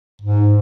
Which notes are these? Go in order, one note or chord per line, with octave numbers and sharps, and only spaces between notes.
G#2